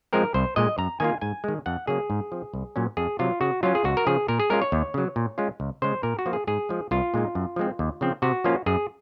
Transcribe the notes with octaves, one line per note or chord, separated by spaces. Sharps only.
F3 G#3 C4 A#4
C2 C5
A#2 G#3 D#5
F#2 A#5
D#3 A#3 F4 G#5
G#2 G#5
D#3 G#3
F2 F#5
C#3 F#3 A#3 G#4
G#2
F3 C4
C2
A#2 F#3 C#4
F2 G#4
C3 F#3 F4
C#3 F#4
F#3 C#4 F4
G#4
C#2 F#4
A#4
C#3 F3 G#4
A#2 A#4
G#4
G#3 C#4 F4 A#4
C#5
D#2
C#3 F#3
A#2
G#3 C#4 F4
C#2
C#3 G#3 C5
A#2 A#4
F#4
F3 A#3 F4
G#4
G#2 G#4
F3 G#3
C2 F4
A#2 G#3 D#4
F#2
F3 G#3 C4
D#2
C#3 F3 C4
C3 F#4
F3 A#3 C#4 F4
F#2 G#4